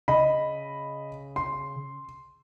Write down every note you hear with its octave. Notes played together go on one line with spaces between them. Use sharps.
C#3 D#5 B5
C6